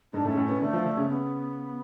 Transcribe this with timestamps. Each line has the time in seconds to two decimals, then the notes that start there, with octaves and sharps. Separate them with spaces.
0.13 G#2 G#3 D4
0.25 A2 A3
0.29 C#4
0.36 A2 A3
0.45 B2 B3 C#4
0.61 D3 A3 D4
0.73 F3 F4
0.84 D3 D4
0.97 C#3 C#4
1.09 B3